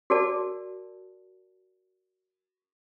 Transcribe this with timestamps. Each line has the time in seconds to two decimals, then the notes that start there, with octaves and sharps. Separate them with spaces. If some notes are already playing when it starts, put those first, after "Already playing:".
0.10 F#4 G#4 A#4 D5 A5